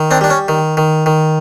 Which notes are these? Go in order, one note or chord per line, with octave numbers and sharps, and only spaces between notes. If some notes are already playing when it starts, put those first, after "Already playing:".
Already playing: D#3
C4 D4
G3 D4
C#4
D#3
D#3
D#3